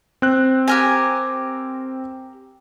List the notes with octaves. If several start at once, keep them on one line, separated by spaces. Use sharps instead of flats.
C4 F#6
G4 A#4 G#5